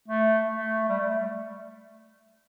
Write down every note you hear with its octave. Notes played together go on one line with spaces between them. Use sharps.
A3
A3
G3
A3